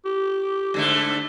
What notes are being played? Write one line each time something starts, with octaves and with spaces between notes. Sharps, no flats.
G4
G#2 D3 A3